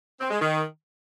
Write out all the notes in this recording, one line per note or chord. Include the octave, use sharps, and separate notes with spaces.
C4
G#3
D#3